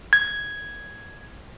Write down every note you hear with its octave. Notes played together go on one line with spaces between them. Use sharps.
G#6